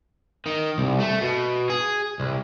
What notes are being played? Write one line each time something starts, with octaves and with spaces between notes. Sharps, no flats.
D#3
C2
A3
B2
G#4
C2